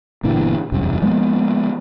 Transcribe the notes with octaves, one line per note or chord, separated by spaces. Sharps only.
G1 A#2 D3 E3
E1 C2 F#2
F3 G#3 A#3 B3